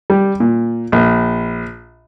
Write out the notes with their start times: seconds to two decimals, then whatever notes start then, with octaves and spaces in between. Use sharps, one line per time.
0.10 G3
0.40 A#2
0.92 A#1